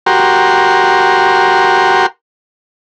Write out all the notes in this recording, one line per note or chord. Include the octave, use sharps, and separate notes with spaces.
F#4 G4 A#4 C6